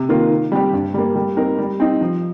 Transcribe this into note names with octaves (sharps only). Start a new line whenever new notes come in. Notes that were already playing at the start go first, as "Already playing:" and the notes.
Already playing: C3
D#3 A#3 F4
D#3
G3 C4 G4
G2
G3 A#3
G3
C4 D#4 A#4
G3
C4 D#4
F3